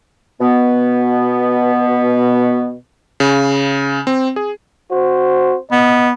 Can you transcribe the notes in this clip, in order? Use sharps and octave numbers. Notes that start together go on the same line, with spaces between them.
B2 B3
C#3
C4
G#4
C4 F#4 C5
B2 B3 D#5